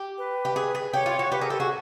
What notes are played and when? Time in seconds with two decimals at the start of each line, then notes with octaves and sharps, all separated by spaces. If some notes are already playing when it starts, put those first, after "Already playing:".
Already playing: G4
0.18 B4
0.45 G4
0.56 G#4
0.75 G#4
0.93 G4 C#5
1.06 F4
1.19 F#4
1.32 G4 B4
1.41 G#4 A#4
1.50 G4 A4
1.60 F#4 G#4